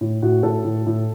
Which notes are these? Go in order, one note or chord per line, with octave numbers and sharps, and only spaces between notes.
A2
A2 F#4
A2 A4
A2
A2